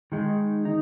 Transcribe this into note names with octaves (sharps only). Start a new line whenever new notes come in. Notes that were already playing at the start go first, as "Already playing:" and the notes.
D#3 G#3 D#4
D#4